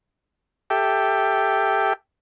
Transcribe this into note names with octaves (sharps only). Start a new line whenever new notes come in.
G4 A4 E5 G5